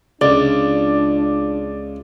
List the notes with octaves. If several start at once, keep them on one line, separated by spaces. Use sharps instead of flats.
C#2 D4 D5